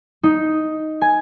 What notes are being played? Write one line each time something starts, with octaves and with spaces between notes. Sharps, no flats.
D#4
G#5